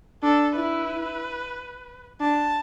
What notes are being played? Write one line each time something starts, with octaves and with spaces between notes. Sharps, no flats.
D4 A4
E4 B4
D4 A5